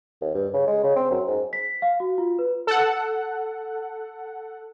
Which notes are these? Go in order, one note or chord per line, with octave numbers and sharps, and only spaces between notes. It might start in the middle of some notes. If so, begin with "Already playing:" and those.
D#2
G2
C#3
G#3
C#3
C4
F#2
G#2
B6
F5
F#4
F4
B4
A4 F#5